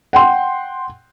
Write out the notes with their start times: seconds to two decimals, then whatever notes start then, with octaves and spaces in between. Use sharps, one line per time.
0.13 F#5 G5 C6